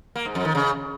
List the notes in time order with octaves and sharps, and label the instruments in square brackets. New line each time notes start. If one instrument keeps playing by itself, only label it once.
[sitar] A#3
G#2
F2
D#3
C#3